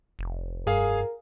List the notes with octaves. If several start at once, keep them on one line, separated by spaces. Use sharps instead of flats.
F1
G2 G#4 A#4 F5 G#5